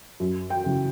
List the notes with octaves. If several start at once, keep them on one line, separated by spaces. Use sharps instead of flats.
F#2
G5
C#3 E3